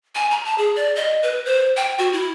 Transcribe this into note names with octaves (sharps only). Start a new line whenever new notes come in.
G#5
A#5
A5
G#4
D5
D#5
B4
C5
G5
F#4
E4